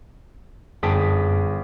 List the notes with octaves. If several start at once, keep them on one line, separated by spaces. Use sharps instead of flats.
G1 F#2 G#4 G5 A5 D#6 B6